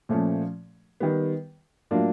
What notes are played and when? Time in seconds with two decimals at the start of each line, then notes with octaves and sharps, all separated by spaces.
0.09 A#2 F3 A3 C#4
1.00 D#3 G3 B3
1.91 A2 F#3 A#3 D4 F4